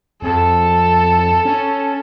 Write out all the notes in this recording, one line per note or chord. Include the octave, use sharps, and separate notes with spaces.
F2 A4
C#4